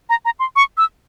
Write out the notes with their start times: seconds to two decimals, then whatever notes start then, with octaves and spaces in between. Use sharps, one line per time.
0.09 A#5
0.25 A#5
0.39 C6
0.56 C#6
0.77 E6